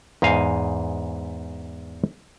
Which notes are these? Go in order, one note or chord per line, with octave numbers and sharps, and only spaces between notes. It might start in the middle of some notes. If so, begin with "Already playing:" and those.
E2 G#2 D#5 F5 G#5